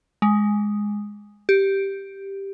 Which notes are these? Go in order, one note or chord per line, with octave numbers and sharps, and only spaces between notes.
G#3
G4